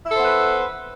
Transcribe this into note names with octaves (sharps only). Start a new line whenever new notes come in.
B3 E4 A4 B4 C5